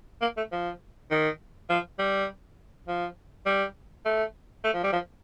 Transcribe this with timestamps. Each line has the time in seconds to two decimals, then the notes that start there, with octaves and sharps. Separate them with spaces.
0.21 A#3
0.37 A3
0.52 F3
1.11 D#3
1.69 F3
1.99 G3
2.88 F3
3.46 G3
4.06 A3
4.64 A3
4.74 F3
4.83 G3
4.93 F3